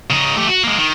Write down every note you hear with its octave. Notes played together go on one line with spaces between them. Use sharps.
C#3 D#4
A3 G4
F#4
G#3 A#3
D#3